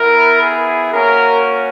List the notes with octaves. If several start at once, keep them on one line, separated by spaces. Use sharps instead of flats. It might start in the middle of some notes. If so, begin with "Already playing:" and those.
Already playing: B3 E4 A#4
G#4
A#3 C#4 F#4 A#4